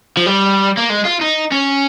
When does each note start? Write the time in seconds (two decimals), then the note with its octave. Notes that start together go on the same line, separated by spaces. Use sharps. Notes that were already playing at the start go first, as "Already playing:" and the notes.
0.17 F3
0.26 G3
0.77 A#3
0.90 G#3
1.05 F4
1.21 D#4
1.52 C#4